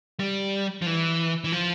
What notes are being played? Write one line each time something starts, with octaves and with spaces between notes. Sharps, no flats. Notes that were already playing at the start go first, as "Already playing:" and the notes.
G3
F3
E3
E3
F3